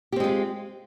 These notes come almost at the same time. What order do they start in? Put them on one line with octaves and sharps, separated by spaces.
G4 C4 G#3 F4